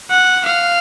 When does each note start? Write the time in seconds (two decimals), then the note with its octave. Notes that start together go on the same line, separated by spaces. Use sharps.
0.10 F#5
0.46 F5